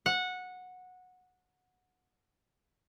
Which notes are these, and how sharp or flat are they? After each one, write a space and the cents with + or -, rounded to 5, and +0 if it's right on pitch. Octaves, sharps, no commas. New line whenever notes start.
F#5 -15